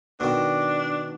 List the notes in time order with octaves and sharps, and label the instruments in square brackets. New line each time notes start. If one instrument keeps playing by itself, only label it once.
[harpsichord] B2 D#3 [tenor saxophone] D4